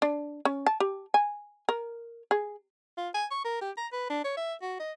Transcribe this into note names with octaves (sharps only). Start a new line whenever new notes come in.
D4
C#4
A5
G4
G#5
A#4
G#4
F4
G#5
C#6
A#4
G4
A#5
B4
D4
C#5
E5
F#4
D#5